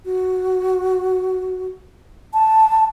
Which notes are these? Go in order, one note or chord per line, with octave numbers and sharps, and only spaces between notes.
F#4
A5